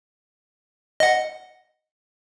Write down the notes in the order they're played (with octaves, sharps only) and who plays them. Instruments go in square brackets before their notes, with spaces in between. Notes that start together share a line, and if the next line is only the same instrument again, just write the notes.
[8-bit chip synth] D#5 F#5